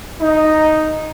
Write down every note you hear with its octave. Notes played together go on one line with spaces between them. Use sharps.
D#4